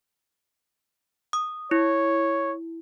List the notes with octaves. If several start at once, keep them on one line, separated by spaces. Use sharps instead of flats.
D#6
E4 C#5